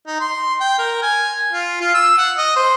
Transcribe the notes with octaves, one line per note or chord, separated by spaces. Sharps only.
D#4
C6
G5
A#4
G#5
F4
F4
E6
F#5
D#5
C5